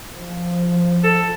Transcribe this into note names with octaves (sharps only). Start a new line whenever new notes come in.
F3
A4